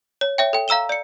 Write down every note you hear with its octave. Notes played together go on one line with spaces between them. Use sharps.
C#5
C#5 E5 G5
A4 G5
F5 A#5 E6 E7 G7
D5 C#7